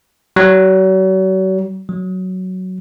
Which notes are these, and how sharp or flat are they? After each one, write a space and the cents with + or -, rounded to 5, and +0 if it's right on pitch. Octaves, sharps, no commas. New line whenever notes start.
F#3 +40
F#3 +5